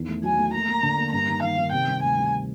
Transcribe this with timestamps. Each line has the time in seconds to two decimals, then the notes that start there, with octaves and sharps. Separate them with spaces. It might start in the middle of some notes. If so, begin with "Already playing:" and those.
Already playing: E2 D#3
0.09 A3
0.23 F#3 G#5
0.39 A3
0.54 A#3 A#5
0.69 A#3
0.83 D3
0.98 A#3
1.12 G2 A#5
1.28 D#3
1.43 D#3 F5
1.58 D#3
1.72 C3 G5
1.88 G3
2.03 D2 G#5
2.17 G3